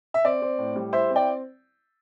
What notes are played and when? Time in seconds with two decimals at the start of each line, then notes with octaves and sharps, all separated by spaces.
0.14 E5
0.25 C4 D5
0.42 C4
0.58 A2
0.76 G3
0.93 E4 C5 E5
1.10 C4
1.16 D5 G5